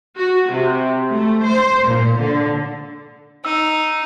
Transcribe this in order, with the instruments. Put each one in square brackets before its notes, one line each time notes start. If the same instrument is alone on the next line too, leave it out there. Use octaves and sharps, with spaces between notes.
[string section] F#4
C3
A3
C5
A#2
D3
[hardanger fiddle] D#4 [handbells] E6